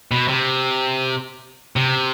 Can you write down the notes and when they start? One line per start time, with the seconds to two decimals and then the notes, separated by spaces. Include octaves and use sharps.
0.11 B2
0.28 C3
1.76 C3